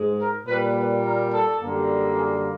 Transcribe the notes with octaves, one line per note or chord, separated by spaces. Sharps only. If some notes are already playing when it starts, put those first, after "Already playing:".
Already playing: G#2 G#3
A#4
A#2 G3 A#3 B4
B4
A#4
A4
F#2 D3 G3 A#3
G#4